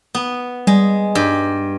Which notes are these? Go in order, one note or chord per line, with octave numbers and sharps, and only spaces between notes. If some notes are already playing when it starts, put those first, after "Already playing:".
B3
G3 G#3
G2